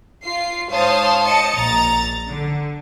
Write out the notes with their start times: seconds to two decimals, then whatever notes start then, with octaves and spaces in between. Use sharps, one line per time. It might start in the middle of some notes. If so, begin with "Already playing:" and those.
0.24 F4 C7
0.69 G#2 C5 C#5 F5 A5 D#6
1.25 D#5 A5 A6 C#7
1.55 A#1 A#5 A6
2.28 D3